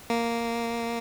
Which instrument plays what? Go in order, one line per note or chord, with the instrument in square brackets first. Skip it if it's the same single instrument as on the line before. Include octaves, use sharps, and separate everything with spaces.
[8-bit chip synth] A#3